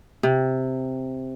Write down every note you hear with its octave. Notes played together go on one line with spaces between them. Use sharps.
C3